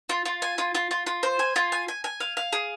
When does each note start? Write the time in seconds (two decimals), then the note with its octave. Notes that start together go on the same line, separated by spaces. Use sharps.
0.09 F4
0.25 F4
0.42 G#5
0.58 F4
0.75 F4
0.91 F4
1.07 F4
1.23 C5
1.39 G#5
1.56 F4
1.72 G#5
1.88 G#5
2.04 G#5
2.20 F5
2.37 F5
2.53 G#4